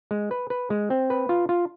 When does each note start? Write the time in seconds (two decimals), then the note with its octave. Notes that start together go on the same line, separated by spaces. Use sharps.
0.11 G#3
0.31 B4
0.50 B4
0.70 G#3
0.90 C4
1.10 B4
1.29 F4
1.49 F4